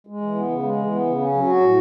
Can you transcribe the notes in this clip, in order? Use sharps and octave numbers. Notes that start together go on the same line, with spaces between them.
G#3
E3
B3
C#3
G#3
E3
B3
C#3
C#4
F#3
F#4
A2